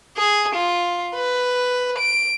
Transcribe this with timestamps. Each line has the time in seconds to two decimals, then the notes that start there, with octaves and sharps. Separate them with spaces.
0.17 G#4
0.55 F4
1.15 B4
1.99 D7